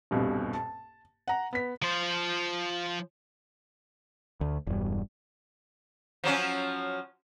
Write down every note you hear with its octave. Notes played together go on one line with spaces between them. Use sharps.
D#1 C2 G2 B2
A5
F#5 A#5
B3 B6
F3 C5
D2
E1 G2
F3 F#3 C#4